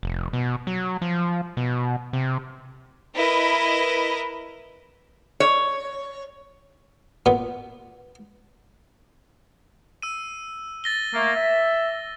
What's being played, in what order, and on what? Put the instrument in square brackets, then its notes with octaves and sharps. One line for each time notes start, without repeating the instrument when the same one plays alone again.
[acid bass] F1
B2
F#3
F3
B2
C3
[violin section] E4 A#4 B4 D#5
[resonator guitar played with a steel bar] C#5
[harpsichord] A#2 B3
[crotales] E6 D#7
A6 A#6 G7
[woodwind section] A3 A#3
E5